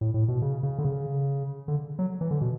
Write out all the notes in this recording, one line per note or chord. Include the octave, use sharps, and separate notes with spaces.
A2
A2
B2
C#3
C#3
D3
C#3
D3
F#3
E3
D3
B2